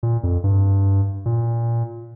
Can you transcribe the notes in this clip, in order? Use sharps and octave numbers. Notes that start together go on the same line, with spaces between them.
A#2
F2
G2
A#2